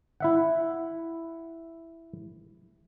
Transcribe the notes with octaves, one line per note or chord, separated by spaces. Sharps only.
E4 E5 F#5